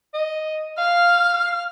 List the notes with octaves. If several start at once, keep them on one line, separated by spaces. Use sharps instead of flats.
D#5
F5 F6